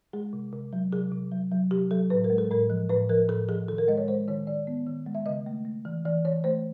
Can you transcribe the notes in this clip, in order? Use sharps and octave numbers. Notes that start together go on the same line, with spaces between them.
G#3 G#4
C3
C3
F#3
C3 G#4
C3
F#3
F#3
C3 G4
F#3 A4
A2 B4
A#4
G#3
A4
A2 A#4
F3
A2 B4
F3 A#4
A2 A4
F3 G#4
D#3 A4
A#4
G#3 D#5
C#5
G#3 C5
D#3 C#5
D#3 D5
B3
D#3
G#3
E5
C#3 D#5
A3
A3
E3
E3 D5
E3 C#5
A3 C5